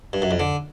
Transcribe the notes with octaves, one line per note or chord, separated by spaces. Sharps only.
G2
F#2
F2
D3